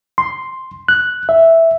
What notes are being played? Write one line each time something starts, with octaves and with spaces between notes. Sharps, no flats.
C6
F#6
E5